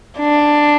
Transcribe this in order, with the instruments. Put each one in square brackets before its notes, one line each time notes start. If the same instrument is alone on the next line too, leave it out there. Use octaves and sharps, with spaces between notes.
[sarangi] D4